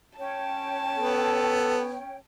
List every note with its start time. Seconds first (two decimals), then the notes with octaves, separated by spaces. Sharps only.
0.18 C#4 C#5 G5 A5
0.98 B3 A4